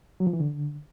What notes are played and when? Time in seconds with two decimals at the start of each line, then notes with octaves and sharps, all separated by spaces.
0.20 F#3
0.27 F3
0.33 E3
0.40 D3